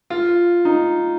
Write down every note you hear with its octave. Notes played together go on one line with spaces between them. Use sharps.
F4
D#4